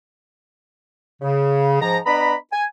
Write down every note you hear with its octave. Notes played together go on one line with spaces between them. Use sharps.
C#3
G#2 F3 A#5
B3 D4 D#5 A#5 B5
G#5